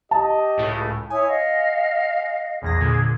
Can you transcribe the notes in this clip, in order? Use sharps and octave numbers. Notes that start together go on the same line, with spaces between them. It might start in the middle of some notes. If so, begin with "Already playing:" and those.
G4 D#5 A5
C#2 A2
E4 C#5 G#5 D#6
D#5 F5 F#5
A#1 E2 G#4 G#6 A#6
A#2 D3